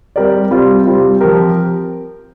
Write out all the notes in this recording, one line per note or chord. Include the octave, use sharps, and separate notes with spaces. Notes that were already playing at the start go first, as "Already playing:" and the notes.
G3 C4 G4 A#4 D5
C3 G3 C4 F4
C3 G3 C4 F4
F3 C4 G4 A#4